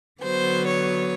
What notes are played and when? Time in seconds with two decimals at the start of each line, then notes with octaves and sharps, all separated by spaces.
0.22 D3 F#3 B3 C5
0.66 C#5